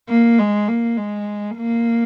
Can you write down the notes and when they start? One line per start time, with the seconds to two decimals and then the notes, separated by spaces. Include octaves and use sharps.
0.09 A#3
0.39 G#3
0.69 A#3
0.97 G#3
1.56 A#3